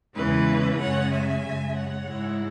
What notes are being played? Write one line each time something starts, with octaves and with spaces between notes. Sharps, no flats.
E2 C#3 E3 G#3 C#4 B4
F#2 C#3 G#3 C#4 C#5 F#5
E5 G#5
F#2 C#3 G#3
C#5 F#5
G#2 G#3 E4